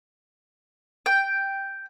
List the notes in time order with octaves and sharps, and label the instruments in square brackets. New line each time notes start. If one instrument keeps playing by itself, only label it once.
[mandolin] G5